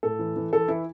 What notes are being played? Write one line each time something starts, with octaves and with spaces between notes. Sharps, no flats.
A2 A4
E3
E3
E3 A4
E3 E4